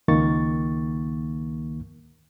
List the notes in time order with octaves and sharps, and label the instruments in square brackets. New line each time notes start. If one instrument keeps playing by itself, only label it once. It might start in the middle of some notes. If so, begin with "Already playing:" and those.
[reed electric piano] C#2 D#3 A#3 C#6 A6